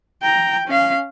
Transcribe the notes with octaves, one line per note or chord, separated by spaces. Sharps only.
G5 A#5
C#4 F5